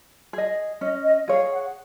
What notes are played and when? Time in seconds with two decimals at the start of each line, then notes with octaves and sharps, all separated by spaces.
0.33 G#4 D#5
0.81 C#4 D#5
1.04 D#5
1.28 G#4 C#5 F5
1.52 F#5